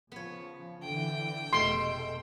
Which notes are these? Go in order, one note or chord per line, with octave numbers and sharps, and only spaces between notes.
C#3 F3 B3 C#5
D3 E3 G5
F1 B2 G#3 A3 C6